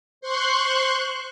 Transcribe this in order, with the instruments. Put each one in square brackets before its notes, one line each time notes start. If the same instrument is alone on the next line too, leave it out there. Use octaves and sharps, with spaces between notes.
[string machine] C5 C6 C#6 F#6